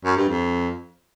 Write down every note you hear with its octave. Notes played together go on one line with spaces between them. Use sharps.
F#2
G2
F2